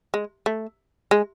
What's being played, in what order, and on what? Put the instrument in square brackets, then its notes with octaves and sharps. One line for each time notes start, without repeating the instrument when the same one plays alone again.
[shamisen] G#3
A3
G#3